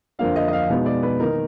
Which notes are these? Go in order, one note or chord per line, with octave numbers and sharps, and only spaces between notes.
F2 D3 F3 A#3 D4 F5
D#5
D#5
F5
B2 G#3 B3 D#4
D5
B4
D#3 A#3 D#4 A#4